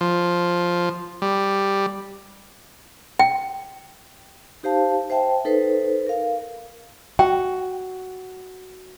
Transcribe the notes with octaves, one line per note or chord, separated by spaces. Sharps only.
F3
G3
G5
D#4 G4 C5 F5 A5
C5 E5 G5 A5
D#4 A4 B4 C5
A#4 F5
F#4 G5